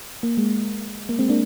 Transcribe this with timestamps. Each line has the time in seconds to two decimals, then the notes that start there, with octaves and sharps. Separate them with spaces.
0.23 A#3
0.38 G#3
1.09 A#3
1.19 G#3 C4
1.29 A#3 D4